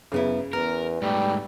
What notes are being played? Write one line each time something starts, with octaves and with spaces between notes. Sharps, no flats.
F#2 C#3 B3 E4
E2 B3 A#4
G#2 G3 A3